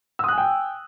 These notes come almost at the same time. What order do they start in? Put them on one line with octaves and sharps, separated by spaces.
E6 D#6 F#6 G#5 G5